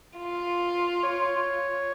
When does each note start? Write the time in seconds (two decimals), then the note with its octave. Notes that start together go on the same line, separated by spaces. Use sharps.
0.18 F4
1.03 C#5